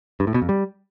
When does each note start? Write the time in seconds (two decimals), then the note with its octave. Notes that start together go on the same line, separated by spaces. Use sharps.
0.20 G2
0.27 A2
0.34 B2
0.42 F2
0.49 G3